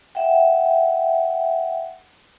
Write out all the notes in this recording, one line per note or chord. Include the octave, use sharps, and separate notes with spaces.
E5 F#5 G5